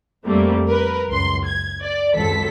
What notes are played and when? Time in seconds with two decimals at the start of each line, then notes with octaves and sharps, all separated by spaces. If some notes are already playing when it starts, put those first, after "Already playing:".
0.25 F2 G3 A3 A#3 C4
0.68 A#4 B4
1.09 C#2 F#2 C6
1.46 G#6
1.81 D5
2.14 G#1 C#2 F#2 A4 B6